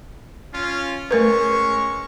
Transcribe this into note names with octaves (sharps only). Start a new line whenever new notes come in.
C#4 F4
G#3 A3 C#4 A#4 B4 C#6